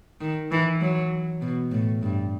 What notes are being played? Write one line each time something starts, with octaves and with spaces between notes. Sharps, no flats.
D#3
E3
F#3
B2
A2
G2